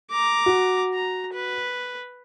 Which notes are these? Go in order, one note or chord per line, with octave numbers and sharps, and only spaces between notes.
A#5 D6
F#4
A#5
B4